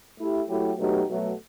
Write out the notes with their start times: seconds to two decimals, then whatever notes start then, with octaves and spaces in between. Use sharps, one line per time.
0.18 A3 E4 G4
0.48 F#3 A3 E4 G4
0.78 B2 F#3 A3 D#4 G4
1.08 B2 F#3 A3